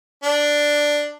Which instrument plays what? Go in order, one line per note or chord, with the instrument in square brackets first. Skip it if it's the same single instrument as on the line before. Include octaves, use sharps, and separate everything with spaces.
[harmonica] D4